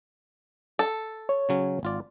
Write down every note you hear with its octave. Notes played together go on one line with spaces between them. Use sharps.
A4
C#5
C#3 F#3 C#4
G#1 F4 D5